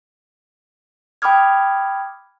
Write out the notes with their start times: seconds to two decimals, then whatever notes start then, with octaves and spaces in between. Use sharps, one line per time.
1.22 G5 B5 D6 D#6 F6 G#6